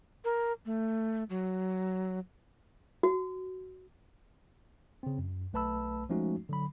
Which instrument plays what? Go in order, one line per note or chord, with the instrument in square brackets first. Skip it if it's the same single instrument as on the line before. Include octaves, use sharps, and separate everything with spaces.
[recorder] A#4
A3
F#3
[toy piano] F#4
[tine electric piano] C#3 C4
F#2
B1 A3 B4 A5 B5 E6
F3 G#3 A3 C#4 D#4 F#4
D3 F#3 B5